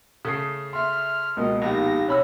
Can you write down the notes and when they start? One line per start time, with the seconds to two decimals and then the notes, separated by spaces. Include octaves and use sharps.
0.25 C#3 A3 D#6 C7
0.73 E5 C6 F6
1.37 C#2 B2 A#3 D#5
1.62 A#1 D#4 G4 F5 A#6
2.08 C3 C#5 B5 E6